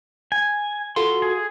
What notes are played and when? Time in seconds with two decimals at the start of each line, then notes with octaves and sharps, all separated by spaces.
0.32 G#5
0.96 F4 F#4 A4 C6
1.22 G#4